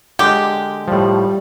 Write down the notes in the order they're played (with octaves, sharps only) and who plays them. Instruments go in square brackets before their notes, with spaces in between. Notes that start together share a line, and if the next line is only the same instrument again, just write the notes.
[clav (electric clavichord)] D3 G#3 [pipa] G4
[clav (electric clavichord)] A2 F3 [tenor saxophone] G3